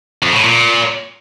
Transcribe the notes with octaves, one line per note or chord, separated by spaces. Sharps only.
F2
A2
A#2